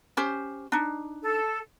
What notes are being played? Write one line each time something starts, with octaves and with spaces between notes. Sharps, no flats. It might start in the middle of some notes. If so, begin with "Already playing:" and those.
C#4 G4 C5
D4 D#4
A4